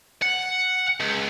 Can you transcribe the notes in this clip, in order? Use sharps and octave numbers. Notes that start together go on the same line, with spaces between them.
F#5
C#2